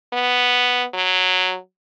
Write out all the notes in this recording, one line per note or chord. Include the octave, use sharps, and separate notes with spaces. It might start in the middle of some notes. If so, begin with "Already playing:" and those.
B3
F#3